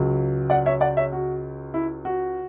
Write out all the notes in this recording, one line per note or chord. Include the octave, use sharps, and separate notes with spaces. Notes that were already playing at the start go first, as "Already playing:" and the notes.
Already playing: C#2 C#3 F#3
D5 F#5
C#5 E5
D5 F#5
C#5 E5
F#4
E4
F#4